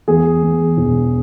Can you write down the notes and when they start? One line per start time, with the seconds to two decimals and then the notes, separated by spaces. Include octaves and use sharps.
0.08 E2 G#4
0.42 E2
0.77 E1